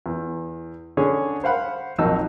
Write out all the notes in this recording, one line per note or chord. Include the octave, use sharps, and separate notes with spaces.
E2
D3 C#4 G#4 C#5
C5 F5 F#5 B5
A#1 F2 F#3 D#4 A5 E6